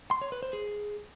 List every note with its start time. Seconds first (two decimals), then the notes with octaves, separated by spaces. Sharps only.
0.11 C6
0.22 C#5
0.32 B4
0.43 C5
0.53 G#4